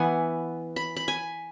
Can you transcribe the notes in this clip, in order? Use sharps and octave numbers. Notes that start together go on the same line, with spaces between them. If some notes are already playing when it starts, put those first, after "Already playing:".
Already playing: E3 B3 F#5 G#5
B5
B5
G#5